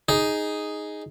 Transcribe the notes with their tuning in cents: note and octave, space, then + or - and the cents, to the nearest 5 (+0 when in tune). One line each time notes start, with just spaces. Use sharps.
D#4 +0 G#4 +0